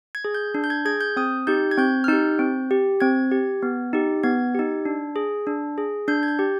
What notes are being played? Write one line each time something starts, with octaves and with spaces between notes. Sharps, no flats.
G#6
G#4
G6
D4
G6
G#6
G#4 G#6
G6
C4 D#6
D#4 G4 G6
G#6
C4 G6
F6
D#4 G4 G6
C4
G4
C4 G#6
G4
B3
D#4 G4
B3 G#6
D#4 G4
D4
G#4
D4
G#4
D4 G6
G#6
G6
G4